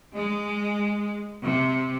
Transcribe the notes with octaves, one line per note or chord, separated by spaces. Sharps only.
G#3
C3